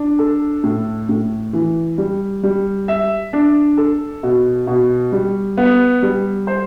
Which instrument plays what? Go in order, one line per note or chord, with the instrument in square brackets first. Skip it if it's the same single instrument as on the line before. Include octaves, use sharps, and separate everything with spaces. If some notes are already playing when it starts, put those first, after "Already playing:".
Already playing: [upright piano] D4
A4
A2
A2
E3
G3
G3
E5
D4
A4
B2
B2
G3
B3
G3
C5